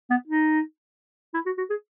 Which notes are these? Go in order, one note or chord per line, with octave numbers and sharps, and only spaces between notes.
B3
D#4
E4
F#4
F#4
G#4